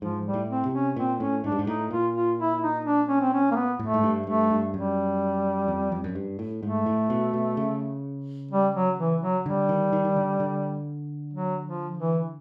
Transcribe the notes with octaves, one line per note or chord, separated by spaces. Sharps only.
G#2 F3
G3
A2
C4
C3
C#4
A#2 C4
A2 C#4
G#2 D4
G2
G#2
A2 D#4
A#2 F4
F4
E4
D#4
D4
C#4
C4
C#4
A#3
B3
A2 A3
G#2
G2
G2 A3
G2
F#2 G3
F2
F2
F#2
G2
A2
G#2 A3
A2
B2
B2
C#3
G3
F#3
E3
F#3
D3 G3
D#3
D#3
D#3
D3
D3
F#3
F3
E3